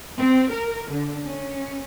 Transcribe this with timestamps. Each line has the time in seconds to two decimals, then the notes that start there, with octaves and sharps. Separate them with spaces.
0.18 C4
0.51 A#4
0.90 D3
1.26 C#4